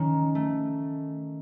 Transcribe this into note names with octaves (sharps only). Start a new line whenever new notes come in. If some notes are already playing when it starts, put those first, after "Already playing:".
Already playing: D#3 C#4
A3